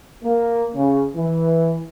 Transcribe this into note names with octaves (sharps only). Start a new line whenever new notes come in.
A#3
C#3
E3